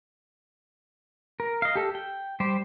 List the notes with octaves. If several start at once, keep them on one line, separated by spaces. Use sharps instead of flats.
A#4
D#5 F5
G4 A4
G5
G3 G4 C5